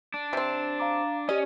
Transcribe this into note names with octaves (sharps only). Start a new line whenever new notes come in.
D4
C3 C4
F5 A#5 D6
C#4 G4 D5 D#5